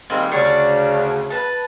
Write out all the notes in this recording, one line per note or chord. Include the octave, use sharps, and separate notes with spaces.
D#3 G3 G#3 A#3 C4
D2 C#3 D4 C#5 C#6
B4 A5